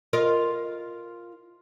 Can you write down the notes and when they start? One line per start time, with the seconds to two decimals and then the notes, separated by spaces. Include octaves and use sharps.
0.13 F4 A#4 D#5